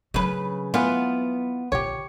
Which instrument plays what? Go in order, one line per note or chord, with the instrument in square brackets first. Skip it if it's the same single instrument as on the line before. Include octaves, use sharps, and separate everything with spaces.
[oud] C#3 B4 [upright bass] F#3
[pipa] E3 F4 [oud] B3
[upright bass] A#1 D3 [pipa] G4 C#5